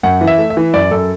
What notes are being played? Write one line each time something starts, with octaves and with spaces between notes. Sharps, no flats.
F#2 F#5
E3
E5
A3
E5
E3
F#2 D5
F#2 A4